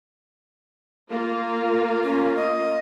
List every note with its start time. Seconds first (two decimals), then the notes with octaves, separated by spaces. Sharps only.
1.10 A#3 F4
2.04 C#4
2.36 D#5